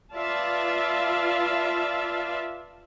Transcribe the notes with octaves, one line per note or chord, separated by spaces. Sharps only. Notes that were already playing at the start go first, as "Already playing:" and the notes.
F4 B4 D5 E5 F5 A5